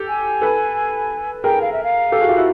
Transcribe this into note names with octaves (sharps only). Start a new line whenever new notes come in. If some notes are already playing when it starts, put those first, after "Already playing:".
Already playing: G4 A4
G#5
A4 B4
G#4 A#4 G5
F5
E5
F5
G4 A4
F#4 G#4
F4 G4
E4 F#4